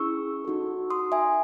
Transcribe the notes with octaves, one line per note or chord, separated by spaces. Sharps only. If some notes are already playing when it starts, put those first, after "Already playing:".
Already playing: C#4 E4 G#4 C#6 E6
D#4 F#4 A4
C6 D#6
E5 G#5